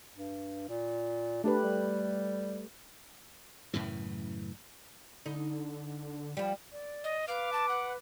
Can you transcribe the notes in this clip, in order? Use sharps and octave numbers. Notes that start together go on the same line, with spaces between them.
G2
A#2
A3 D4 G4 B4
G3
F#2 A2 C#3 E3
D3 D#4
F3 G3
D5
D#5
B4 F5 D6
A5
F#5